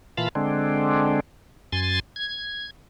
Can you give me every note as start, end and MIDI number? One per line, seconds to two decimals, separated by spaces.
0.17 0.28 46
0.17 0.28 52
0.17 0.28 65
0.17 0.28 77
0.17 0.28 81
0.17 0.28 83
0.35 1.20 50
0.35 1.20 56
0.35 1.20 60
0.35 1.20 62
1.72 2.00 42
1.72 2.00 80
1.72 2.00 84
1.72 2.00 93
2.16 2.70 92